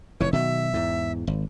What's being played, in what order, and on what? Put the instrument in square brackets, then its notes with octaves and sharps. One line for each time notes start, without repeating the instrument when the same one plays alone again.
[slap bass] F1 E3 [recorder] C#5
[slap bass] B2 D#3 F#3 [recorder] E5
[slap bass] E2 G#2
G#1